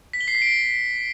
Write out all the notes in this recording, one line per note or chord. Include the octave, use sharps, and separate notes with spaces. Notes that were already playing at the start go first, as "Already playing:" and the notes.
B6
G7
C7
B6
D7